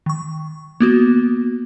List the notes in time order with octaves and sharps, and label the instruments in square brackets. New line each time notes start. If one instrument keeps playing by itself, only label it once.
[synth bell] D#3 C#6
A#3 B3 F#4